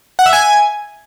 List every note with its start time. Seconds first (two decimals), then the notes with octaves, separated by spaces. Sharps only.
0.19 F#5
0.26 E5
0.33 G#5